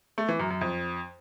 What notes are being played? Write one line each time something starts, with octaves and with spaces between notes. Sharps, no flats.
A3
E3
F#2
F#2
F2